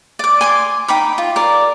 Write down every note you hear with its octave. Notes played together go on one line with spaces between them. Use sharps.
D5 D6
G#5 C6 D6
D#4 G5 B5 D6
F4
A#4 D5